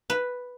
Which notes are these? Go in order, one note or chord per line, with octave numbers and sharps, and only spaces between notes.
B4